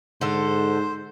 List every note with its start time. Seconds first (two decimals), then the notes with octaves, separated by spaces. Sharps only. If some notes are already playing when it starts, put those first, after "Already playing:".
0.21 G#2 D3 A4 C5